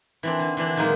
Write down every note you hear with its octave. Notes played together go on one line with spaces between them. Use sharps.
E3 C4 D4
D3
D3 E3 D4
A#2 D#3 F#3 G#3 A#3